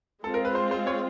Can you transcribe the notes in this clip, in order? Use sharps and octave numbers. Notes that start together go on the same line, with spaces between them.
G#3 C4 F4 A4
A#4
B4
C5
C5
C#5